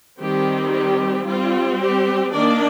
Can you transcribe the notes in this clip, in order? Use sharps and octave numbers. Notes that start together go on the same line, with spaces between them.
D#3 G3 C4 G4
G4
G3 C4 F4
G4
D#3 A#3 D4 D5